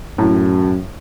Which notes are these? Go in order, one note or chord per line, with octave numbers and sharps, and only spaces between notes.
F#2 A2